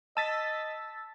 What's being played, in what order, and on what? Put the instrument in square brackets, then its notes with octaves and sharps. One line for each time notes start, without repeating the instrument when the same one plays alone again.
[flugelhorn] D#5 [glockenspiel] A5 [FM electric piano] E6 A6 B6